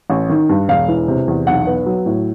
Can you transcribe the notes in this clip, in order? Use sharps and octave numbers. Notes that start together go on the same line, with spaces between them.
A1
D#3
G2
E1 F5
E3
C3
E2
B1 F#5
B3
F#3
A2